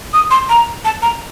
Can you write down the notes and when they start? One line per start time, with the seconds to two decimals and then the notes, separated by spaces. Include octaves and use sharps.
0.14 D#6
0.31 C6
0.49 A#5
0.85 A5
1.02 A#5